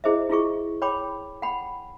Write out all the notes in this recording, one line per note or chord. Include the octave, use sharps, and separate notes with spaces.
E4 G#4 C5 D#5 E5
E4 F4 G#4 C#6
C#5 G5 B5 D6
F#5 G5 B5